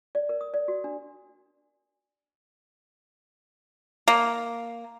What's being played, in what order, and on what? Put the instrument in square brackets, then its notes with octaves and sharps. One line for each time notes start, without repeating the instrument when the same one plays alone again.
[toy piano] D5
A#4
D#6
D5
F#4
D4
[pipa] A#3